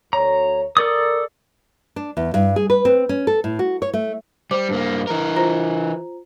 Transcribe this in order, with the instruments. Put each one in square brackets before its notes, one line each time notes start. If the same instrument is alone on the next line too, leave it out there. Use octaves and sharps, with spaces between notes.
[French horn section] D2 C#5 [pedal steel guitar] A#5
[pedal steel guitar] A4 D5 D#6 [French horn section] A#4
[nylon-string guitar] D4
E2
G2
G#4
B4
C4
C#4
A4
A2
F#4
C#5
A3
[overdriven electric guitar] G3 [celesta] C5 D6
[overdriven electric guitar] G2 A#3
E3 A#4
[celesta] F4 C5 A#5